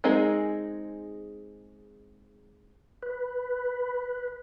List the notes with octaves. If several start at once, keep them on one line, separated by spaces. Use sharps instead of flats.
G#3 C4 D#4 G#4 A#4
B4